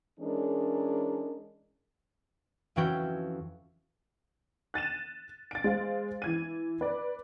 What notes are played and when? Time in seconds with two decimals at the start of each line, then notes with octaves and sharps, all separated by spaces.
0.19 E3 G#3 C#4 D4 G#4 A#4
2.76 F2 E3 C#4 F#4 G5
4.74 F#6 A6 D#7 E7
5.51 A6 D7
5.64 G#3 C5 F5
6.22 E3 G#6 D#7
6.81 B4 D5